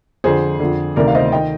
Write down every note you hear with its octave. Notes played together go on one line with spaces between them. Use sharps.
F2 D3 G#4 C5
F2 D3
D2 C3 D#3 A#4 D5
F5
C5 D#5
D#3 D#5 G5